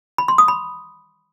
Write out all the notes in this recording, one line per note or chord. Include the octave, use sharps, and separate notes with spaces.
B5
C6
D#6
B5